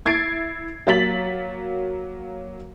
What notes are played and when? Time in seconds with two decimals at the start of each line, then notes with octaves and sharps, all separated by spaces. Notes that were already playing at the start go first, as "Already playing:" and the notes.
0.05 E4 G#6 A6 C7 D7
0.87 F#3 A#3 A6 B6 F#7